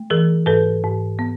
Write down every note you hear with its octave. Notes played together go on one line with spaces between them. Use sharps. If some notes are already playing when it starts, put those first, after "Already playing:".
Already playing: A3
E3 G#4 A#4
G#2 A4 B4
G#2
B3